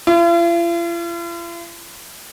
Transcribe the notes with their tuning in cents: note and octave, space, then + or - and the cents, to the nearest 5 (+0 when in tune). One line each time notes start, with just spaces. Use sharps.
F4 -45